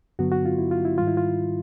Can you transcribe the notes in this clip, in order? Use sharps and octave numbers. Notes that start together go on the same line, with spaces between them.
G2 D3 F#3 B3 F#4
F#4
F4
E4
F4
E4
G#2 D#3 G3 F4
E4
F4